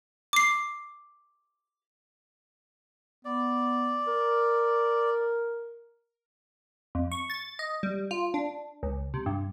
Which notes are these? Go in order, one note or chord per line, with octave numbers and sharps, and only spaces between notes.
D6 C7
B3 D5
A#4
F2
C#6
A6
D#5
G3
F4
D4
C#2
C3
G2